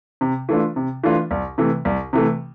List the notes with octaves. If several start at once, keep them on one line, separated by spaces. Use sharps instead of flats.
C3
E3 A3 D4 F4
C3
E3 A3 D4 F4
C2
C3 E3 A3
C2
C3 E3 A3